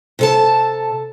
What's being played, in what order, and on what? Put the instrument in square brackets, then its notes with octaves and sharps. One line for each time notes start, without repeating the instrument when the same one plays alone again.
[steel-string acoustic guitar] C3 A4 A5